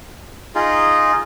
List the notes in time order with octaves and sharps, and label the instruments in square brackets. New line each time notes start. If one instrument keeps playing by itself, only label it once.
[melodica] D#4 F4 G#4